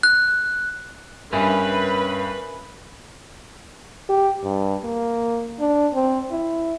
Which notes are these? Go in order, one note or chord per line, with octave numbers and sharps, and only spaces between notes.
F#6
G2 C#4 A#4 B4 E5 G#5 B5
G4
G2
A#3
D4
C4
E4